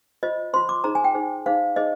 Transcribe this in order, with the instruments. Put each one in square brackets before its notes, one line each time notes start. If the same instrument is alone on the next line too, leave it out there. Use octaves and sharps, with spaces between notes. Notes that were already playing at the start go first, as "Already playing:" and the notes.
[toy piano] F4 C5 D#5
F4 C5 C6
D6
D#4 G#4 C5 A#5
G#5
G5
D#4 G#4 C5
D#4 G#4 C5 F5
D#4 G#4 C5 D#5